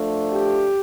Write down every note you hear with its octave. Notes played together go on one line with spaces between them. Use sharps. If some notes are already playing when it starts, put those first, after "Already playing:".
Already playing: F3 A3 D4
G4